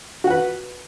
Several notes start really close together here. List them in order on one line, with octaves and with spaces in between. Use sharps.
F#4 F#5 B4